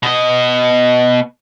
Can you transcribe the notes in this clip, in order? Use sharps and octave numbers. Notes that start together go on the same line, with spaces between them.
B2 D#5